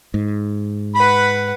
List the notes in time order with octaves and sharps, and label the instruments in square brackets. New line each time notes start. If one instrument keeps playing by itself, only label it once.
[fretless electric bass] G#2
[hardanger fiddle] B4 F#5 [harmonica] B5